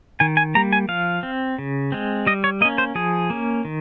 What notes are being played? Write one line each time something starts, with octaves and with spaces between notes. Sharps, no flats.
D#3 G#5
G#5
G3 A#3 A#5
G#5
F3 F5
C4
C#3
G#3 C4
G3 D#5
C#5
A#3 C#4 D#5
C5
F3 G#4
A#3 C#4
D#3